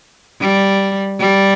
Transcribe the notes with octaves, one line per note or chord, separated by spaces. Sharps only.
G3
G3